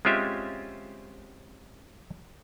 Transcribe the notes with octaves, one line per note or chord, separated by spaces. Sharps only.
G#3 C4 C#4 F4 G4 E5